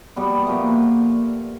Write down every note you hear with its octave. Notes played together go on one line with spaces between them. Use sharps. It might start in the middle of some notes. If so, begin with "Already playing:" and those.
B2 G3 B3
A#2 F3 A3